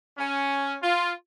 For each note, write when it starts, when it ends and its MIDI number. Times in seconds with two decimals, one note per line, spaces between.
0.18 0.75 61
0.82 1.12 65